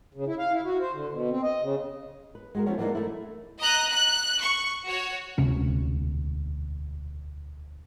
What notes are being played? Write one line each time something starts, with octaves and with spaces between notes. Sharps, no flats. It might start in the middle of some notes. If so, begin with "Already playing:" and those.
C#3
E4
F5
E4
F#4
C5
D3
B2
C4
D#5
C#3
B4
G#3 F#4 A#4
E3 F3 B3 C#4 F#4 C#5
E3 F#3 G#3 A#3 D4 D#4
A3 E4
D#5 A#5 F#6
F#6
C#6
F#4 C#5
E1 D2 C3 C#4